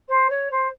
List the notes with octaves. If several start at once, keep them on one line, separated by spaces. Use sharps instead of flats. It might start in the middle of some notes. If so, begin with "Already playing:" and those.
C5
C#5
C5